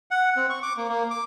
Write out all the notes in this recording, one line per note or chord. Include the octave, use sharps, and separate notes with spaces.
F#5
C4
C#6
D6
A#3
A#3
D6